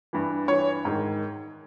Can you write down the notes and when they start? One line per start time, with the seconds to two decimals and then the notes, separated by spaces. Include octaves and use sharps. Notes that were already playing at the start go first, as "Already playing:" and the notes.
0.13 G2 E3
0.48 G2 E3 C#5
0.85 G#2 D#3